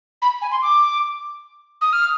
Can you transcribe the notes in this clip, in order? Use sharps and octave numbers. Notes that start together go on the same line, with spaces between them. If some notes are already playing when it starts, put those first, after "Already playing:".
B5
G#5
C6
D6
D#6
F6